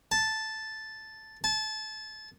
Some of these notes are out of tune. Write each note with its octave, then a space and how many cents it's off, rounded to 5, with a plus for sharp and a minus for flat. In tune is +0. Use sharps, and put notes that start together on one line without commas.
A5 -5
A5 -25